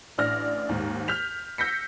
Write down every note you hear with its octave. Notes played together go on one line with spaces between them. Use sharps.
A1 D4 F6 A#6
D#2 G#2
F6 G6 B6 F7
E6 G6 A#6 B6 C#7